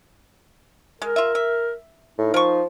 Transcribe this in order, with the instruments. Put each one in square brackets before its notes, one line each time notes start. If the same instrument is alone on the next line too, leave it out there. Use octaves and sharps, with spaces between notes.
[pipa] G#3 [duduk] A#4
[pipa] F4 E5
E5
[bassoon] A2 [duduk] D#4
[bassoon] F3 [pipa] A#4 C#6